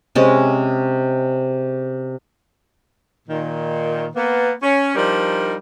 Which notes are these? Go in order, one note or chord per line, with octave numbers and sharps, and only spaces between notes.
C3 G#3 C#4 D#5
A#2 D#3
A#3 B3
C#4
F3 G3 D4 D#4 A#4